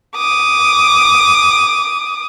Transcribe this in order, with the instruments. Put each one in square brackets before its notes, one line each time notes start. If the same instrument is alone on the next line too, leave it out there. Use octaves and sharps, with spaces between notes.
[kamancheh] D6 D#6